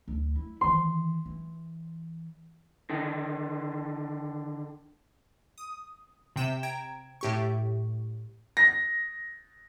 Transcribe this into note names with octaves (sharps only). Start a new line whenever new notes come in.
D2
E4
D#3 E3 C6
E3
D3 D#3
D#6
C3 G5 E7
G5 A#5 G#6 D7
A2 G4 C#6
A#6